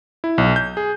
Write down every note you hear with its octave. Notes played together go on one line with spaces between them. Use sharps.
E4
B1
G6
G#4